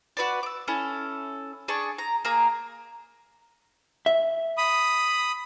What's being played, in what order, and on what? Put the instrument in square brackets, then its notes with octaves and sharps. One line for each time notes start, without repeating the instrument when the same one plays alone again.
[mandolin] F#4 B4 D5
D6 E6
C#4 E4 A4
D4 G#4 A5 C#6
A#5
A#3 G#4 A#5
[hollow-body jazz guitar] E5
[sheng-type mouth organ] B5 D#6